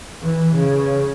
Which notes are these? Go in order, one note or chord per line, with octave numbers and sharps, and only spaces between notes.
E3
C#3